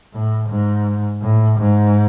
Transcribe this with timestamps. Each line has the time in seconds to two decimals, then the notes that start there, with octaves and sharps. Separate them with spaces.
0.13 A2
0.49 G#2
1.22 A2
1.59 G#2